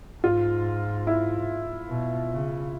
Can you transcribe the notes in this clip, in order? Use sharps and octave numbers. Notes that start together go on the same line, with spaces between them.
G#2 F4
E4
B2
C#3